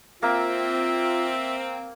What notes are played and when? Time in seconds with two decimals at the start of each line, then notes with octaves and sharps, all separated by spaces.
0.23 A#3 C4 F4 E5